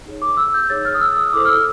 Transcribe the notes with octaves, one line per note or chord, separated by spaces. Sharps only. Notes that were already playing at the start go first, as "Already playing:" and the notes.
D#4 G#4 C#5
D6
E6
G6
D#4 G#4 C#5 A6
F6
D#6
E6
D#6
E4 A4 C5 D6
F6
E6